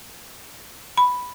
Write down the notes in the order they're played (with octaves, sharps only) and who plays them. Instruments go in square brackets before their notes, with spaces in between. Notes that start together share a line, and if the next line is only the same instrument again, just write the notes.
[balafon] B5